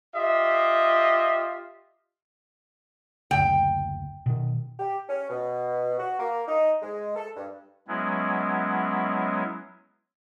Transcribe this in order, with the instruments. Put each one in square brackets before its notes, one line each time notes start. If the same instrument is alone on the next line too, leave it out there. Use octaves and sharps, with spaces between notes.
[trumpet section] F4 G4 D#5 E5
[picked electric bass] F#1 D2 [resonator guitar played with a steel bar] G5
[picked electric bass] B2 D#3
[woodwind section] G4
C#4
B2
F#4
A#3
D#4
G#3
A4
G2
[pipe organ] F#3 G#3 B3 C#4 E4